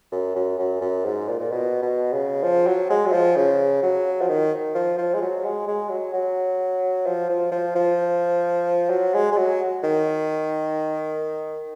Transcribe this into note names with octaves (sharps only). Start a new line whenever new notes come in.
F#2
F#2
F#2
F#2
G#2
A#2
A#2
B2
B2
C#3
F3
F#3
G#3
F#3
F3
C#3
F#3
F3
D#3
F3
F3
G#3
F#3
G#3
G#3
F#3
F#3
F3
F3
F3
F3
F#3
G#3
G#3
F#3
D#3